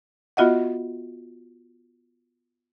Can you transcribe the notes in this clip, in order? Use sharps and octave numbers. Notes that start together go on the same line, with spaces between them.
B3 F4 F#4 D#5 E5 F#5